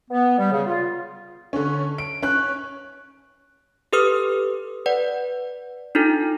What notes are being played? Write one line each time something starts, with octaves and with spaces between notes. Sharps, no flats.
B3
G3
C#3
F4
D3 C#4
D7
C#4 F#6
G4 A4 B4 D#6 F6
B4 D5 F#5
D4 D#4 F4 A4